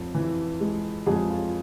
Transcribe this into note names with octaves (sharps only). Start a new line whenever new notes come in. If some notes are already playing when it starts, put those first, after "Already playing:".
Already playing: F2
E3
G#3
F2 G#3 G#4
F4